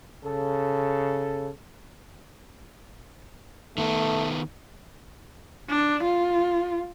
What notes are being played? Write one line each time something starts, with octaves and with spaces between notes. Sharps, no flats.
C#3 A4
D#3 A3 B3
D4
F4